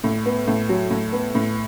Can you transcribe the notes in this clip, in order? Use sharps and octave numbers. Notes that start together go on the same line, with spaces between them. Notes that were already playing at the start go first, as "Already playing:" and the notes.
A2
B3
A2
F#3
A2
B3
A2